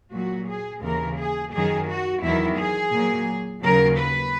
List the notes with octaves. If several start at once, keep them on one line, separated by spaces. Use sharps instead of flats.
A#2 F#3 F#4
G#4
D#2 C#3 E3 A#4
G#4
F#2 D#3 F#3 G#4
F#4
E2 D#3 F#3 E4
G#4
A#2 F#3
D#2 C#3 F#3 A#4
B4